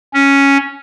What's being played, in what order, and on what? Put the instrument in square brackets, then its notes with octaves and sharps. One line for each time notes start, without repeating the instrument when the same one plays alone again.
[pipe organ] C#4